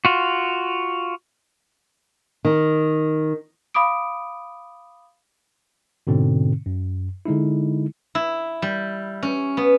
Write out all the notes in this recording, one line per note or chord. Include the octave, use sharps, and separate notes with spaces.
F4 F#4
D#3
F5 B5 D6 D#6 D7
G#2 B2 D3 C4
F#2
D3 G#3 D#4 E4
E4
G3
C#4
B3